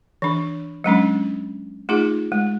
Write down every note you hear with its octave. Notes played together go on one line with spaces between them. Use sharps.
E3 D4
F#3 G#3 C#4 D4
A3 D#4 F4 G#4
G#3